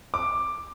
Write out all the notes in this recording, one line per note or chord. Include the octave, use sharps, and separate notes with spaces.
D6